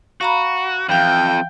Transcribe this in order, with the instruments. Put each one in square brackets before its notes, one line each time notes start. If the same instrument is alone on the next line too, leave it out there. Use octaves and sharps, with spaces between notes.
[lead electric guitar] F#4 [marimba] F5 A#5 B5
[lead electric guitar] F2 [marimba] E3 F5 [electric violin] G5